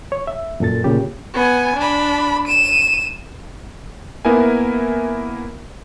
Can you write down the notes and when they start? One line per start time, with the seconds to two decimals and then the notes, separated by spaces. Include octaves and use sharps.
0.12 C#5
0.27 E5
0.60 F#2 A#2 A4 A6
0.84 A#2 C#3 G4
1.34 B3 G#5
1.77 D4 B5
2.48 D#7 E7
4.25 A#3 B3 E4 A#4 G#5